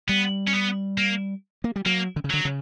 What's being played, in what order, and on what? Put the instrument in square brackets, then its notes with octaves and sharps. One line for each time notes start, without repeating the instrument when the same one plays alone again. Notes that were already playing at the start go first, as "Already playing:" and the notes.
[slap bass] G3 [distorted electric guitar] B3
[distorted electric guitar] C#4
B3
A#3
[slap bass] A#3
G3
[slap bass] F#3 [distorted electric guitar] A#3
[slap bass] D3
C#3
[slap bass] D3 [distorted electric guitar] F#3
[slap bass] C#3